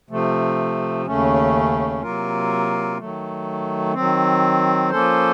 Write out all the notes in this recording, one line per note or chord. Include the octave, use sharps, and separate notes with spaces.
C3 F3 A3
D#2 C#3 A3 C#4
C3 F#3 A#3 F4 A#4
D#3 F#3 A3
D#3 F#3 C4
F3 A#3 C#4 A4 C5